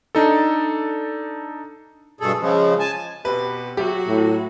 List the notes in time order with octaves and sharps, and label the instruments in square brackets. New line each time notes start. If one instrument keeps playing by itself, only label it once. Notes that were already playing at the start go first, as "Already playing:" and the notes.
[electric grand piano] D4 D#4 A4
[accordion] G2 B2 G#4 A4
C#3 F3 G#3
G#5 A5
[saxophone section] B2 C4 G4 [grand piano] B4
[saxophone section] F#3 E5 [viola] F#4 [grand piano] G4
[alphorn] A2